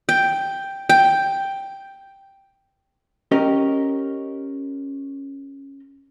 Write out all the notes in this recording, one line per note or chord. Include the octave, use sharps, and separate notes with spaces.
G5
G5
C#4 G4 A#4 D#5